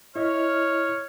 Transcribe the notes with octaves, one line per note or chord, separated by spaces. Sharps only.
E4 C#5 D#5 F6